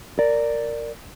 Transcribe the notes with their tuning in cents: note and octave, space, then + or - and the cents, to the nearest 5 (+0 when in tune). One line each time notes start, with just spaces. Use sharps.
A#4 -15 D5 +0